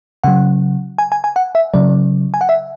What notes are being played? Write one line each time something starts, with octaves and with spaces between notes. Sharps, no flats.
C#3 F#3 F#5
G#5
G#5
G#5
F#5
E5
C#3 F#3 D5
G#5
F#5
E5